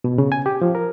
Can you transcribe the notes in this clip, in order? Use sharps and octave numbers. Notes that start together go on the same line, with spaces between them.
B2
C#3
G#5
G4
F3
A#4